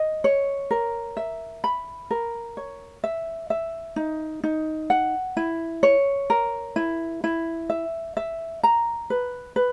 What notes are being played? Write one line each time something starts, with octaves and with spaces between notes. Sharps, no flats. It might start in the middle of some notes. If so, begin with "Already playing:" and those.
Already playing: D#5
C#5
A#4
E5
B5
A#4
C#5
E5
E5
D#4
D#4
F#5
E4
C#5
A#4
E4
E4
E5
E5
A#5
B4
B4